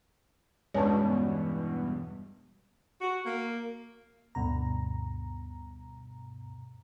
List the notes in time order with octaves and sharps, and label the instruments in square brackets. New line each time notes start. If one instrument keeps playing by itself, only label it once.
[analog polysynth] E2 G2 B2 [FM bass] G#3 [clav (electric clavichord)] C#4 D4
[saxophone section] F#4
A#3
[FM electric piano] D2 G2 B2 A#5